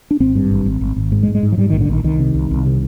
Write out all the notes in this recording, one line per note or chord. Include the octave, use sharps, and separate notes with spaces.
D4
G#1 C4
G2
G#1
G#1
G#1
G#1
G#2
G#3
G#2
G#3
G#2
F3
G#2 G3
A#1 D#3
D3
A#1 D#3
C2 D#3
C3
C2
C2
C3